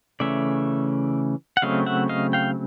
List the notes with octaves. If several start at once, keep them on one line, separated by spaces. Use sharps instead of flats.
C#3 E3 A3 C#4 D5 E5
F#5
C#3 F#3 A3 C4 D#5 F5
E5 F#5
D#5 F5
F5 G5